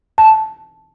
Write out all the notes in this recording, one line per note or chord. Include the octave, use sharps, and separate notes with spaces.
A5